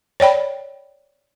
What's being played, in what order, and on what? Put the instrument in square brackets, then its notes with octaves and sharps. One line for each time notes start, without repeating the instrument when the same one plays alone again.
[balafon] C#5 D5 G5 B5